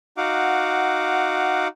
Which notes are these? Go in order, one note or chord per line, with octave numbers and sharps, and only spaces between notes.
D#4 F#4 F5 F#5 D6